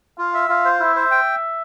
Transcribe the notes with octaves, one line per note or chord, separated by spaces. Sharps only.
F4 F5
E5
F4 F5
C5
E4 E5
C5
G5